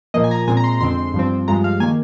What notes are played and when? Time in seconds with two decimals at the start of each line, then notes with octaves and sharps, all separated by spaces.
0.14 A#2 F3 A#3 D#5
0.24 G#5
0.31 A#5
0.48 A#2 G#3 C4 G#5
0.57 A#5
0.64 C6
0.81 F2 D3 G#3 C4 C6
1.14 G2 F3 C4
1.48 G2 F3 G#3 A#5
1.64 F5
1.80 D#3 A#3 G#5